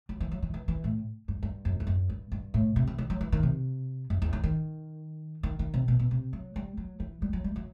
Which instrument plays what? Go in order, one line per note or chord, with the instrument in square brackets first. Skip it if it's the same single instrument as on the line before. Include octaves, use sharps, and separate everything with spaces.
[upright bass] F#3
E3
F#3
E3
E3
E3
A2
G2
G2
F#2
E2
F#2
G2
G2
A2
C3
E3
D#3
F#3
E3
D#3
C3
F#2
E2
D#3
D#3
D#3
D#3
C3
B2
B2
C3
F#3
G3
F#3
E3
G3
F#3
G3
F#3